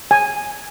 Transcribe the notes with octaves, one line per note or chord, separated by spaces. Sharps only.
G#5